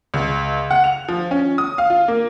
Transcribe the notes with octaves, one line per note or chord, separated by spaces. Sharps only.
C#2
F#5
F7
F3
C#4
D#6
F5
F4
A#3